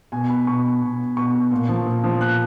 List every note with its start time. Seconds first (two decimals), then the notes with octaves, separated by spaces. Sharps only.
0.12 B2 G#5
0.30 B5
0.47 B2 C#6
0.82 B2
1.17 B2 C#6
1.51 A#2
1.69 F3
1.87 A#2
2.04 F3
2.21 A#2 F#6